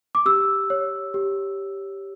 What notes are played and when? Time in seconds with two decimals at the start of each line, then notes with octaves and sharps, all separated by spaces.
0.15 D6
0.26 G4 E6
0.70 C#5
1.14 G4